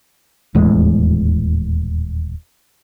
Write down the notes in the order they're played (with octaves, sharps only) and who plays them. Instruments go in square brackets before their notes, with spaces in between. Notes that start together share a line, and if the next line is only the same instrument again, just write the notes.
[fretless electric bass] D#1 E2 A2 G#3